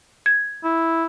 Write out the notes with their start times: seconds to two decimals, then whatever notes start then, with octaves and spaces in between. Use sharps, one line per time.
0.26 G#6
0.64 E4